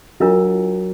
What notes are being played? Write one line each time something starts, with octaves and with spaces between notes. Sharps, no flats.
F#3 D4 F4 A#4 D#5